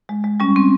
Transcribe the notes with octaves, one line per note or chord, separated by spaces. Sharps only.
G#3
G#3
G3 C#4
C4